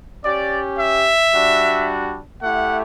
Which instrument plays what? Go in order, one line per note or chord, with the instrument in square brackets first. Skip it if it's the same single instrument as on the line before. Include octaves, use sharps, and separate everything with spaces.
[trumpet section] C#4 G4 D5
E5
G3 D4 F#4
A3 E4 G4 F#5